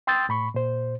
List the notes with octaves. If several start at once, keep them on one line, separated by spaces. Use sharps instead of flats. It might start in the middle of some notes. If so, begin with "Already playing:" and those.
G5 C6 D#6 E6 G6 A6
A2 B5 C#6
A#2 C5